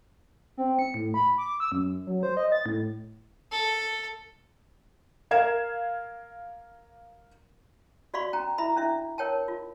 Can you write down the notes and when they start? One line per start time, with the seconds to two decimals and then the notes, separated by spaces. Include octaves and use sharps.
0.57 C4
0.79 C#7
0.94 A2
1.14 B5
1.38 D6
1.60 E6
1.72 F#2
2.07 F#3
2.23 C5
2.37 D#5
2.52 A6
2.66 A2
3.52 A4
5.31 A#4 F5 G#6 E7
8.14 F#4 D5 F5 B5 C#6
8.33 C#4 G5 A#5
8.58 E4 E5 A#5 B5
8.76 C#4 D4 E4 E5
9.18 A#4 C#5 G5 A5
9.48 F4